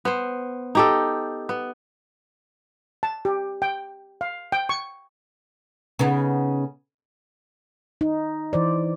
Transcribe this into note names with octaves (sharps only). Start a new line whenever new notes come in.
B3 C5
D#4 G4 A4
B3
A5
G4
G5
F5
G5
C#6
C#3 B3 D#4
D#4
E3 C5 D5